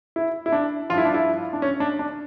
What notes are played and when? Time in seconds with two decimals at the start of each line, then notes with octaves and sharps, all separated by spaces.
0.16 E4
0.46 E4
0.52 D4
0.89 F3 F4
0.93 G2 E4
1.05 D4
1.14 E4
1.53 D4
1.62 C#4
1.80 D4
1.99 D4